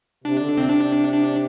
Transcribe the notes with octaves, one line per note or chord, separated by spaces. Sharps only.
C3 D4
D3
C3
C4
D4
D4